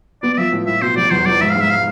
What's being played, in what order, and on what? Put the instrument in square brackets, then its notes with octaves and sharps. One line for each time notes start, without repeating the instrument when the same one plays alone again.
[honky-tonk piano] B3 [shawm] D5
[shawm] D5
[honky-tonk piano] F3 [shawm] E5
[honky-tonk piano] A2
[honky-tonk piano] A2 [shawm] E5
[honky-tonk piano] B2 [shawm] C5
[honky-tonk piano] F1 [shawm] D5
[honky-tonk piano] E2 [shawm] C5
[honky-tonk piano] F1 [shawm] D5
[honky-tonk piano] G#2 [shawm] E5
[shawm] F5
[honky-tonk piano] G#2 [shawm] E5
[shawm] F5